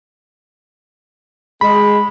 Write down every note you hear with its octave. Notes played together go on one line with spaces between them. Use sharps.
G#3 B5